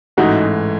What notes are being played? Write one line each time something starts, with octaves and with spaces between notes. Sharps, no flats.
A1 G#2 E3 A3 D#4 F#4